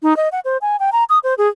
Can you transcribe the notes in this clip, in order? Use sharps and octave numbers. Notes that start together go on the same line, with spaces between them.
D#4
D#5
F#5
C5
G#5
G5
A#5
D#6
C5
G#4